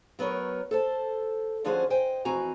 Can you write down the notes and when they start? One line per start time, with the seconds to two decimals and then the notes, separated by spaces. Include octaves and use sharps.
0.19 F#3 B3 A#4 C#5
0.71 A4 C5 A5
1.64 D3 F3 C#4 F#4 G#4 C5
1.90 C5 D#5 G5 G#5
2.25 F2 E3 C4 F#4 G#5 A#5